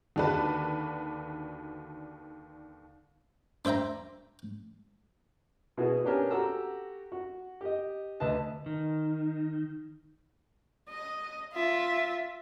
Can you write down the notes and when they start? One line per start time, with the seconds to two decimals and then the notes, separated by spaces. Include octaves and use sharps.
0.16 D#2 D3 D4 F#4 B4 A5
3.65 D4 C5 E5 G5 A#5
5.77 B2 B3 E4 F#4 G#4
6.04 B3 C#4 D4 G4 A#4 G#5
6.30 F#4 G4 A4 A#5 E6
7.12 F#4
7.61 G4 D#5
8.20 D2 B4 D#5 A5
8.66 D#3
10.89 D#5
11.53 F4 E5